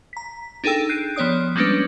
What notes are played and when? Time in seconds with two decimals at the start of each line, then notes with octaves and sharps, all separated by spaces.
0.13 A#5 B6
0.64 D4 D#4 G#4 A4 G5 E6
0.89 F#6 G6 C7 D7 D#7
1.16 F3 B3 C#5 D5 D#6
1.56 G3 G#3 A#3 C#4 D4 B4